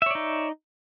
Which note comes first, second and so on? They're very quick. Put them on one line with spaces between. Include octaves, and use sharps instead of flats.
E5 C#5 D5 D#4